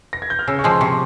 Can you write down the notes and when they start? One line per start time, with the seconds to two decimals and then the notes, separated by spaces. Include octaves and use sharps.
0.13 A#6
0.22 G#6
0.30 G6
0.39 F6
0.48 C#3 E6
0.59 C#6
0.64 F3 G#3
0.70 C6
0.81 C3 C#6